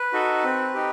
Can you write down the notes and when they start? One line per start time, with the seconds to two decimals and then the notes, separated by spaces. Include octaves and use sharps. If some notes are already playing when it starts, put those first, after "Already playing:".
Already playing: B4
0.13 D#4 F#4 A4
0.44 C4
0.74 D#4 G4